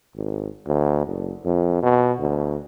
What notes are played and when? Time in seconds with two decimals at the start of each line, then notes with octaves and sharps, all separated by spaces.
0.16 G#1
0.67 D2
1.06 F#1
1.45 F2
1.83 B2
2.20 D2